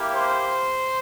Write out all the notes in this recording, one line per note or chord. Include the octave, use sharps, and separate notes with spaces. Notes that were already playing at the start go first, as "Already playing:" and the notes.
Already playing: A#3 E4 G4
C5